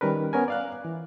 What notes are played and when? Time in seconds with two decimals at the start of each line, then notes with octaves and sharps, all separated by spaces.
0.01 D#3 G3 C#4 A#4 B4
0.33 B3 C#4 A#4 G#5
0.48 D5 F5 F#6
0.85 E3